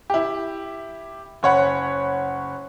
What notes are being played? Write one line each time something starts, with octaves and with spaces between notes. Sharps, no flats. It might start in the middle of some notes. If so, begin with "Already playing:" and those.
E4 G4
F#1 C#5 F#5 B5